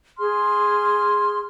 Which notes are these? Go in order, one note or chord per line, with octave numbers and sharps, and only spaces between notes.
G#4 C6 F6